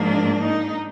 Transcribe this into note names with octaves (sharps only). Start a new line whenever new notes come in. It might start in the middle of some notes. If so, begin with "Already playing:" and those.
Already playing: G#2 F3 A#3 D4
D#4